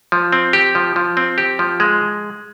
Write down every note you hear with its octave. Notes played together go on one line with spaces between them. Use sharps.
F3
C4
G4
F3
F3
C4
G4
F3
G#3